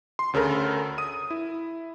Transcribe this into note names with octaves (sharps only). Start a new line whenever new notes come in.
C6
D2 C#3 A4 A#4 B5
D#6 D#7
E4